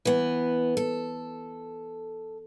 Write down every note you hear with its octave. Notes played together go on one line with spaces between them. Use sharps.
E3 B3
A4